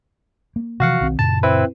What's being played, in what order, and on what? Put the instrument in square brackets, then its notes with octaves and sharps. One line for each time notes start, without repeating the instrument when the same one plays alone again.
[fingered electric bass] A#3
[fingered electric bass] C3 E3 F3 [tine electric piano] F#4 F5 F#5
[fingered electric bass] B1 D#3 C4
[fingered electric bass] F#2 A#2 C#3 [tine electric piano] A5
[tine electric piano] C4 E4 B4